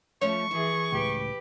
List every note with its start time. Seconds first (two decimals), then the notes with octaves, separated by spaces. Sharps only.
0.22 F3 A3 C#4 C#5 C#6
0.51 E3 E4 G#4
0.92 C#2 A2 G4 B4